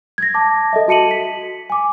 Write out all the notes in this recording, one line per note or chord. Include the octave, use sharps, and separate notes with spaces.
G#6 A#6
A5 D6
A4 D#5 E5
F#4 A5 C#7 D#7 F#7
B6
G#5 D6